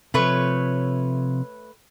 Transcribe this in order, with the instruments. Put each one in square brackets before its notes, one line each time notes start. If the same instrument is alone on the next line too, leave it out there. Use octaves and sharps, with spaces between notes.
[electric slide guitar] C3 F3 [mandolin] A3 B4 C#5